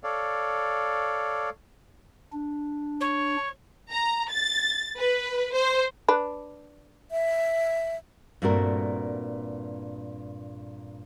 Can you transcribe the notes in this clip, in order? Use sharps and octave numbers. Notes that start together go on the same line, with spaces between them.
A4 C#5 D5 F5
D4
C#5
A#5
A6
B4
C5
D4 B4
E5
G2 A#2 A3 C4 F#4 A#4